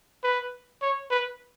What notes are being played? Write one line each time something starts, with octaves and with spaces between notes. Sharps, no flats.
B4
C#5
B4